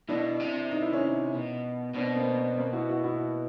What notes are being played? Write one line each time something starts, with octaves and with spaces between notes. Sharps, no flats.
B2 D4 E4
C3
D#4
E4
C#4 D#4
B2
B2 C4 D4
A#3 C4
A#3 C4
E4 F#4
E4 F#4
E4 F#4